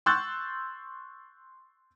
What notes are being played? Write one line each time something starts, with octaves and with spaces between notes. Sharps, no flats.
C6 C#6 E6 F#6 G6 A6